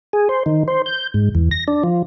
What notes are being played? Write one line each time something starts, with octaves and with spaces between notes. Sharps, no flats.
G#4
C5
D#3
C5
G6
G#2
E2
A#6
D4
F3